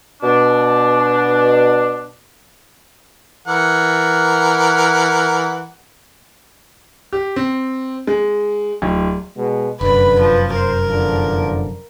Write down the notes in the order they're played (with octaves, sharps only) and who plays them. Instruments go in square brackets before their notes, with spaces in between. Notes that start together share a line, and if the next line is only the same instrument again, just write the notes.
[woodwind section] B2 D4
[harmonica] E3 A#4 F#5
[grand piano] G4
C4
G#3
D1
[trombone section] B2 G#3
[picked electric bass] F1 F#2 [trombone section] D3 B4 [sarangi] B5
[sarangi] F3
[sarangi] A#4 [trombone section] C5
[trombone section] E2 D3 F3